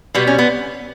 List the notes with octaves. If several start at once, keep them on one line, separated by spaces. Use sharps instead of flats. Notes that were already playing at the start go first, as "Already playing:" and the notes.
B2 G3 B3
C#4
B3